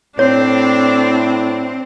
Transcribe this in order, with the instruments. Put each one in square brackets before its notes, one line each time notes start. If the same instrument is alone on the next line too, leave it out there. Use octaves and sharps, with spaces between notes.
[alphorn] A2 [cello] C4 [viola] D4 [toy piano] C#5